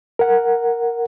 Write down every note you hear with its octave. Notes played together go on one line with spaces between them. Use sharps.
A#4 F#5